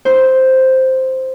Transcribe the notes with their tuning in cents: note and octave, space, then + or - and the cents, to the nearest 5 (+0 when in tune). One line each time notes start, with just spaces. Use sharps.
E4 -40 C5 +0